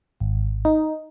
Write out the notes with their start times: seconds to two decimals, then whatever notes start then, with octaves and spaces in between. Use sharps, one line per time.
0.20 G#1
0.65 D#4